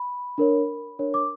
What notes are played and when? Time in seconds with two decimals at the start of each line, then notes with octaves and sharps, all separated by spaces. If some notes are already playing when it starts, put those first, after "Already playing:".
Already playing: B5
0.38 D4 A#4 C#5
0.99 D4 A#4 C#5
1.14 D6